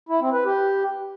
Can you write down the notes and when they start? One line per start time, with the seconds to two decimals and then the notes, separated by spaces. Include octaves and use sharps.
0.09 E4
0.21 C4
0.33 B4
0.45 G4